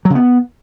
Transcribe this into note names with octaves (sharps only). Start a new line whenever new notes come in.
F#3
C#3
B3